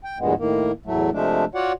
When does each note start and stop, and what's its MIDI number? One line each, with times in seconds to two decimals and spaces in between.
0.04 0.18 79
0.19 0.34 40
0.19 0.34 43
0.19 0.34 46
0.19 0.34 56
0.19 0.34 59
0.38 0.72 45
0.38 0.72 51
0.38 0.72 58
0.86 1.10 40
0.86 1.10 45
0.86 1.10 54
0.86 1.10 57
1.13 1.45 48
1.13 1.45 53
1.13 1.45 56
1.13 1.45 57
1.13 1.45 62
1.55 1.72 65
1.55 1.72 66
1.55 1.72 73
1.55 1.72 74
1.55 1.72 78